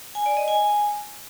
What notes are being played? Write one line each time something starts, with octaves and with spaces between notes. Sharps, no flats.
G#5
D5
D#5
G#5